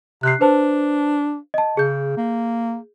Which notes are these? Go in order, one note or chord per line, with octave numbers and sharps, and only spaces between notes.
C3 F#6 C7
D4 B4 C5 A5
D#5 A5
C#3 G#4 G6
A#3